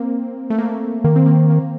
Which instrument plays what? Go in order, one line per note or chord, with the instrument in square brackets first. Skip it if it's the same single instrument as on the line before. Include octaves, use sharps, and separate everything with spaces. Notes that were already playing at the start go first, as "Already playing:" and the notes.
Already playing: [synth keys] A#3 C4
A3
A#3
[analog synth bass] D#3 [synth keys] A#3
[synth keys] C4
A#3
A#3